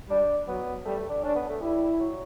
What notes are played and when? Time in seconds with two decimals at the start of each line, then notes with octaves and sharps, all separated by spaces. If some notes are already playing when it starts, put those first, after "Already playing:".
0.09 G3 D4
0.47 F#3 B3
0.85 G3 A3
1.09 D4
1.23 C#4 D4
1.35 B3
1.49 A3
1.61 G3 E4
1.99 F#3